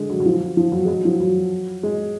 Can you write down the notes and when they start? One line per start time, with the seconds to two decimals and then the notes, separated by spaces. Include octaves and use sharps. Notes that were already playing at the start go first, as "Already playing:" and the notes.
Already playing: D3 G#3
0.10 F#3
0.20 F#3
0.26 F3
0.57 F3
0.72 F#3
0.85 G#3
0.88 F#3
1.05 F3
1.20 F#3
1.83 G#3